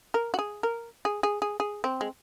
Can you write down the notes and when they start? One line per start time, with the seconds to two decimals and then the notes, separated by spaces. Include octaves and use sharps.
0.14 A#4
0.34 F#4
0.39 G#4
0.63 A#4
1.05 G#4
1.23 G#4
1.42 G#4
1.60 G#4
1.84 C4
2.01 G#3